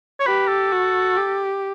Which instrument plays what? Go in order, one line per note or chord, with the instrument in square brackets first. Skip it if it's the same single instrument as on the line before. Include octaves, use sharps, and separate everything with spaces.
[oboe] C#5
[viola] G4 [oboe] B4
[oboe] A4
[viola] F#4
G4